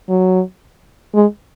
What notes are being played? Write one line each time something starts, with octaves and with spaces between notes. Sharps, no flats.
F#3
G#3